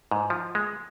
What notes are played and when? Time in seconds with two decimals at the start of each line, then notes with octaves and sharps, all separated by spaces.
0.11 G#2
0.30 F3
0.55 G#3